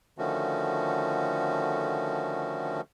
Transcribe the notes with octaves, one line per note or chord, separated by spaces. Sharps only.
D3 D#3 F3 A3 C#4 F#4